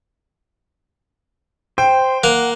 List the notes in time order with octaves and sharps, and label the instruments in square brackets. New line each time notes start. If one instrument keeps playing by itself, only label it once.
[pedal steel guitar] C5 [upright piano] G5
[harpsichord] A#3 A#5 [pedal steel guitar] F#5